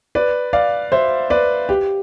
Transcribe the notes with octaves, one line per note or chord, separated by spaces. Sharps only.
B4 D5
D5 F5
C5 E5
B4 D5
G4